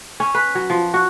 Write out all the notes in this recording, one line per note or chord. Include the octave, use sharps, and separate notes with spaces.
C#4
B4
F#3
F3
F#4